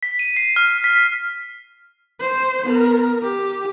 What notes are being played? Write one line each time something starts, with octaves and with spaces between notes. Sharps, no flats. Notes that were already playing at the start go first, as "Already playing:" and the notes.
B6
D#7
C7
F6
B6
C5
B3 A#4
G4